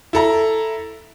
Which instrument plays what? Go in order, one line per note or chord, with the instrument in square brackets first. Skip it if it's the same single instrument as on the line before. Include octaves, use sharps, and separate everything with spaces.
[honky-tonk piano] E4 A4 A#5